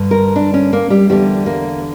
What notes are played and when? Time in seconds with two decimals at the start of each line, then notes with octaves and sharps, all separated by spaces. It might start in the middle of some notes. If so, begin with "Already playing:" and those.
Already playing: G2 D3
0.11 A#4
0.36 D4
0.54 C#4
0.73 A#3
0.90 G3
1.09 E2 D3 G3
1.46 A#3